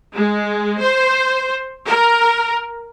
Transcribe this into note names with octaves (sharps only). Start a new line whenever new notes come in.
G#3
C5
A#4